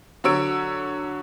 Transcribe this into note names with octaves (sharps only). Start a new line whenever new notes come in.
D3 F#3 C#5 E6 D7